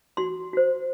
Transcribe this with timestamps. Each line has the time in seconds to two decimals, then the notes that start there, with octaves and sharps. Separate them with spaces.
0.17 F#4 C6
0.53 F#4 C5